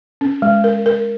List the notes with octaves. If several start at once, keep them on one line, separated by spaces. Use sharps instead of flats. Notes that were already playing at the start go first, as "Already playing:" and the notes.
C#4
G#3
A#4
A#4